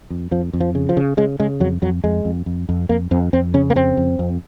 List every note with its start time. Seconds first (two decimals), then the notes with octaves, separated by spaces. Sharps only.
0.10 F2
0.31 F2 F3
0.53 F2
0.60 F3
0.75 C#3
0.89 F3
0.97 C#3
1.17 C#3 G#3
1.40 C#3 G#3
1.60 F2 F#3
1.82 F2 F#3
2.04 F2 G#3
2.25 F2
2.46 F2
2.69 F2
2.89 F2 A#3
3.11 F2 C4
3.33 F2 C4
3.54 C#3 C#4
3.70 A#3
3.76 F2 C4
3.97 F2
4.19 F2